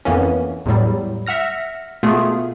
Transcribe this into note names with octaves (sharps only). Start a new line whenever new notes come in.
F2 E3 A#3 B3 C#4
E2 A2 F#3 G3
E5 F#5 F6 A#6
B2 A3 B3 F4 G#4